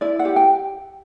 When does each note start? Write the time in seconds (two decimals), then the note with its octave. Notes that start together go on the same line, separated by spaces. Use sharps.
0.01 E4 D5
0.19 F#5
0.25 G4
0.36 G5